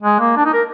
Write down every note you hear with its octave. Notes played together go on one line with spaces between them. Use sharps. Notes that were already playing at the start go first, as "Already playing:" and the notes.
G#3
A#3
D4
D#4
A#4